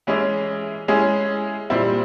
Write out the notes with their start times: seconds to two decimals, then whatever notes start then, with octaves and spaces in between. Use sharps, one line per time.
0.07 E3 G#3 C#4 E4 G#4
0.88 G#3 C#4 E4 G#4
1.70 A#2 G3 C4 E4